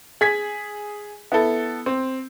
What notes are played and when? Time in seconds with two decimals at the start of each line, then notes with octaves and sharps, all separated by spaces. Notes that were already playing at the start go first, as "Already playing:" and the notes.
0.21 G#4 G#6 B6
1.32 B3 E4 A4
1.86 C4